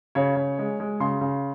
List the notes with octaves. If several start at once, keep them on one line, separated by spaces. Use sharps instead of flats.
C#3 C#5
C#3
G#3
G#3
C#3 C6
C#3